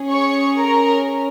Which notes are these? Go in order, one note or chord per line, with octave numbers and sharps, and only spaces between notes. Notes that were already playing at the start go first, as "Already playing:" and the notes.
Already playing: C#4 G#4
C#5 C#6
A#4 A#5